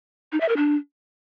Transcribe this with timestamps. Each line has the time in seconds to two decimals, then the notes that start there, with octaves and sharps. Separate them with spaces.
0.32 D#4
0.41 E5
0.49 A#4
0.57 D4